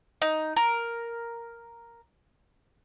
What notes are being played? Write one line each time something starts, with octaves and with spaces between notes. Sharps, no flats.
D#4
A#4